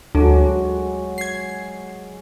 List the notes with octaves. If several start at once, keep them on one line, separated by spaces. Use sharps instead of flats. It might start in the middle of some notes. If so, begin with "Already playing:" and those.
D2 F#3 G#3 F#4
G#6 C7